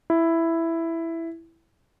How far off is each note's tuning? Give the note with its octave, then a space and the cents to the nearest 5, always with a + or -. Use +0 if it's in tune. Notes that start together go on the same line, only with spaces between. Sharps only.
E4 +5